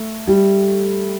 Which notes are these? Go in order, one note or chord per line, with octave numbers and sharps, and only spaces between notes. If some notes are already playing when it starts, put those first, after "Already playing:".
Already playing: A3
G3